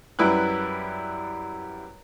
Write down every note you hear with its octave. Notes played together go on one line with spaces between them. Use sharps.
F#2 G3 E4 B4 F#6